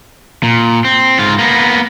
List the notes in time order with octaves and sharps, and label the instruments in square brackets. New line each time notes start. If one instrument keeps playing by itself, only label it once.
[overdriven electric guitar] A#2
C4
G#2 F4
A#3 B3